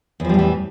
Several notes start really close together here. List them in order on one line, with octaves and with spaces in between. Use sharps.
E2 F3 G3 A2 E3